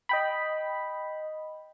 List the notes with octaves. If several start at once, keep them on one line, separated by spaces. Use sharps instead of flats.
D#5 G5 B5